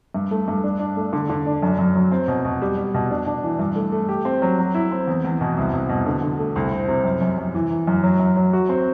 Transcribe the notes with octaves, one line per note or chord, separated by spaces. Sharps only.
G2
A3
G2
D4
D4
A3
D3
D3
D4
F#2
F#2
F#3
C4
B2
B2
G3
G3
B2
D4
D4
E3
G2
A3
A3
G4
C4
F#3
F#3
E4
C4
E2
E2
B2
C2
C2
B2
D3
D3
A3
C2
C4
C3
F#2
F#2
F#2
E3
E3
F#2
F#3
F#2
F#3
F#4
C4